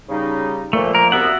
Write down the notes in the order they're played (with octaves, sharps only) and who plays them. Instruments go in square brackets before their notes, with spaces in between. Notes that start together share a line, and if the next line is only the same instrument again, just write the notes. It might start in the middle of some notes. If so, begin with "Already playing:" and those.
[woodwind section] C#3 G3 D#4
[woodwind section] A#2 F3 A#3 [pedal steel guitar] A3
[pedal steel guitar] A#4
[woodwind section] C2 B3 [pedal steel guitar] F#4 E5 F#5